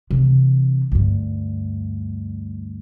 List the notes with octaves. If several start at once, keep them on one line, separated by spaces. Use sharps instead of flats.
C3 E3
D2 G2